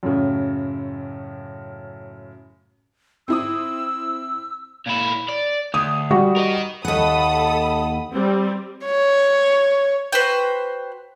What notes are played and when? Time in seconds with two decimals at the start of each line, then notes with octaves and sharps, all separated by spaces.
0.03 F#2 A2 C#3
3.28 C4 E4 D#6 E6
4.87 A#2 E4
5.29 D5
5.74 D2 D#6
6.11 G3 F#4
6.37 A#4 D#5
6.85 D#2 A4 F#5 B5 D#6
8.12 G3 C4
8.85 C#5
10.12 F#4 B4 C5 G5